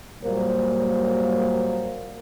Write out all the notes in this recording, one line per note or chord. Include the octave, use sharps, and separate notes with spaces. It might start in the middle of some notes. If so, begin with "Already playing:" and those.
A#2 F#3 G3 A#3 A#4 C5